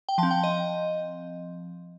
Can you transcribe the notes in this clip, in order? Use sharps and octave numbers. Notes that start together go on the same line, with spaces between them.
G5
F3 A5
C4
G5
D#5